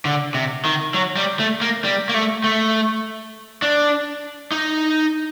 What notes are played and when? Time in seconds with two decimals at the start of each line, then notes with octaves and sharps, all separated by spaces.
0.05 D3
0.34 C3
0.65 D#3
0.94 F#3
1.17 G3
1.39 A3
1.61 A#3
1.84 G3
2.09 A#3
2.14 A3
2.44 A3
3.62 D4
4.52 D#4